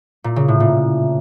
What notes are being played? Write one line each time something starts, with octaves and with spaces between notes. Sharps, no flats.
A#2
C#3
A2
A#2